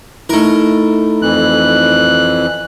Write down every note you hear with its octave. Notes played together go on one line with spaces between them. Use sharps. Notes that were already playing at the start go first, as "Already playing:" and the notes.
A3 D#4 E4 A#4
F2 E3 F#6